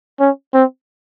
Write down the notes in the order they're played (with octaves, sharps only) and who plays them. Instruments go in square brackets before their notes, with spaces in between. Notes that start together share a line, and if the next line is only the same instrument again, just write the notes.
[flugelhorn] C#4
C4